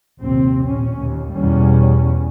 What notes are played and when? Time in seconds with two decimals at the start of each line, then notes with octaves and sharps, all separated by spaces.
0.21 A#1 D#2 C3 C4
0.66 A#2 C#4
1.02 D#2
1.33 E2 B2 G3 C#4